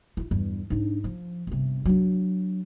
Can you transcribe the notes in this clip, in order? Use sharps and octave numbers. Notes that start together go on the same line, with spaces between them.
E4 F4
E2 G2
G#2 D4
F3
G1 C3
F#3 D4